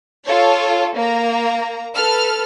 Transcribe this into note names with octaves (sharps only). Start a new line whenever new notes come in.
F4 A4 C#5
A#3 A#5
A4 B4 F6